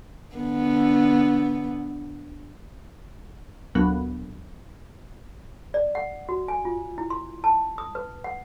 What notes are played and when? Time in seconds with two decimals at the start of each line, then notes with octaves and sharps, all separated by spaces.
0.35 D3 B3
3.75 D2 A#2 F#3 B3
5.74 D5
5.95 F#5
6.29 F#4
6.48 G#5
6.65 F4
6.98 E4
7.10 C6
7.44 A5
7.78 D#6
7.95 B4
8.24 F#5